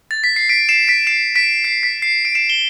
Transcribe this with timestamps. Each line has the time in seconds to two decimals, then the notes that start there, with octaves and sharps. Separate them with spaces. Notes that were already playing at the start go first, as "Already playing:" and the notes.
0.11 A6
0.24 B6
0.36 C7
0.49 B6 D7
0.69 C7 E7
0.87 B6 D7
1.07 C7 E7
1.36 B6 D7
1.64 C7
1.83 B6
2.02 C7
2.25 D7
2.35 C7 E7
2.50 E7 G7